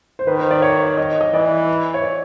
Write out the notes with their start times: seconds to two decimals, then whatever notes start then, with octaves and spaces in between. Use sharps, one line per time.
0.19 C5
0.27 D#3 B4
0.39 C5
0.51 D5
0.62 C#5
0.97 D#5
1.21 D#5
1.33 E3 D5
1.94 C#5
2.04 D5